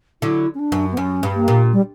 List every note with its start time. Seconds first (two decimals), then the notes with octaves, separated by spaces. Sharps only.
0.22 D3 F#3 E4
0.54 C#4
0.59 D4
0.72 F#2
0.92 B3
0.97 F#2 C#4
1.23 G2
1.35 A#3
1.48 A#2
1.72 G3